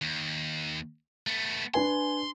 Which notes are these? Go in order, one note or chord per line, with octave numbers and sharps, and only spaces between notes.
D#2
A3 B3
D4 B4 G#5 C6